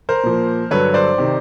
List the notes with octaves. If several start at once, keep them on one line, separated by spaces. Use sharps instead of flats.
A#4 C5
A#2 F3 A#3
G2 D3 F#3 B4 C#5
C5 D5
C3 D#3